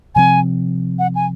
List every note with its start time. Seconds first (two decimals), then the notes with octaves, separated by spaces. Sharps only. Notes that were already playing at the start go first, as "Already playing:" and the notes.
0.15 C3 F3 C4 G#5
0.99 F#5
1.15 G#5